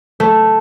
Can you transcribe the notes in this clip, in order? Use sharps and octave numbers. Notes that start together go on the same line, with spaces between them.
A3